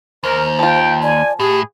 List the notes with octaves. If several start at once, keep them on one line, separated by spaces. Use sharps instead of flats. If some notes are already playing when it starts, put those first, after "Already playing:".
D#2 A#4 C5
F3 F4 G5
D5 G#5
A2 G4 G#4